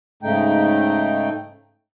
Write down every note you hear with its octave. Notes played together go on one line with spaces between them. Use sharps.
G#2 C#3 A3 D#4 G5